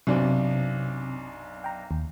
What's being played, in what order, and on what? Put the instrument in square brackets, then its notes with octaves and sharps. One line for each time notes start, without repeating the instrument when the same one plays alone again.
[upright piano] B1 F#2 D4 [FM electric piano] C3 C4
[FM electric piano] G5 A#5
D#2